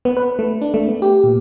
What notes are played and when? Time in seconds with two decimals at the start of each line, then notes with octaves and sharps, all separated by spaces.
0.05 B3
0.17 B4
0.39 A3
0.61 D4
0.74 A3
0.88 B3
1.02 G4
1.23 A#2